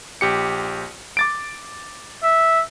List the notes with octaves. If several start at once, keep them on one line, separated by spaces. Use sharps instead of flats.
A#1 G4 C#7
D6 A6 D7
E5